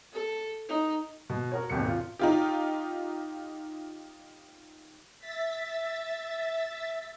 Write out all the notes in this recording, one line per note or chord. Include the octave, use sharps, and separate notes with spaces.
A4
D#4
B2
F#4 A#4 C#5
D#1 G#1 D#2 B2 C#7
F4
D#4 F4 G4
E5 A6 B6